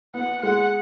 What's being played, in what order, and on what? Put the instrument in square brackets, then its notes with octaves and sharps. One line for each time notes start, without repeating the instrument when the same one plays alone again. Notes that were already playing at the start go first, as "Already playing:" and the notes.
[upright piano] B3 [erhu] F#5
[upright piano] G#3 [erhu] F#5